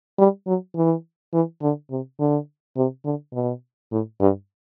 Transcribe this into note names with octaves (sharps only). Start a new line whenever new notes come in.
G3
F#3
E3
E3
D3
C3
D3
C3
D3
B2
A2
G2